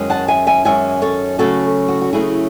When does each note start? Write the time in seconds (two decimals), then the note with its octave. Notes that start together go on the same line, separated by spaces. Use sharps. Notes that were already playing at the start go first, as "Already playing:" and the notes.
Already playing: F#2 D#3 G#3 C#4
0.10 F#5 A5
0.28 E5 G#5
0.47 E5 G#5
0.65 F#2 D#3 G#3 C#4 E5 G#5
1.02 A4 C#5
1.39 C#3 F#3 A3 C#4 F#4 A4
1.88 F#4
2.01 F#4
2.13 C#3 F#3 A3 C#4 E4 G#4